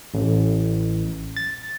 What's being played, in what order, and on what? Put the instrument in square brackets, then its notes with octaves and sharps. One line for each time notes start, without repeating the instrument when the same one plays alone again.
[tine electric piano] A1
A6